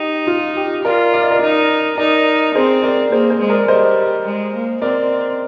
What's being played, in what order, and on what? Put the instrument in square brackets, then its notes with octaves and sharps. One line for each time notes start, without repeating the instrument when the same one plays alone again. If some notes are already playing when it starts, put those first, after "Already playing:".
Already playing: [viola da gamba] D#4 [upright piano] G4
[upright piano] F4
G4
[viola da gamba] F4 [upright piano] A#4 D5
[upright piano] D5
D#5
A#4 D5
[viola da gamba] D#4
[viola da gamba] D#4 [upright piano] A#4 D5
[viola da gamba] C4 [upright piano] G#4 C5
[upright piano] A#4 D5
[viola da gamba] A#3 [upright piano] G#4 C5
[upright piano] G#4 C5
[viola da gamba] G#3
[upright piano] A#4 D5
[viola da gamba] G3 [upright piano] C5 D#5
[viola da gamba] G#3
A#3
[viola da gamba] C4 [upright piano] A#4 D5